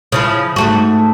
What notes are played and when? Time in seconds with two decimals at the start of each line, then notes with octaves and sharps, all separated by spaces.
0.12 C#3 F3 E4
0.56 G#2 A3 F#4